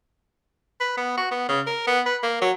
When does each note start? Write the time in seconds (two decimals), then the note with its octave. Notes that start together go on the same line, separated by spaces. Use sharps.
0.81 B4
0.97 B3
1.18 F#4
1.31 B3
1.49 C#3
1.67 A#4
1.87 B3
2.06 B4
2.23 A#3
2.42 F#3